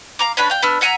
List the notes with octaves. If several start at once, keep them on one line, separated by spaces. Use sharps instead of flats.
F5 A#5 D6
C#4 D4 B4 B5
F5 G5
B3 D4 E6 F6
E5 F#5 G#5 A#5